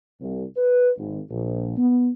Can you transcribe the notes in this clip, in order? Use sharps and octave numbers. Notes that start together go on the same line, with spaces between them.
C2
B4
G#1
A#1
B3